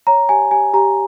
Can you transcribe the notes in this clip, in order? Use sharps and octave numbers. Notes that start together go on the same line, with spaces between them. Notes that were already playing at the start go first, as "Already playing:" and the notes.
C#5 A#5
G4 G#5
G4 G#5
G4 A#5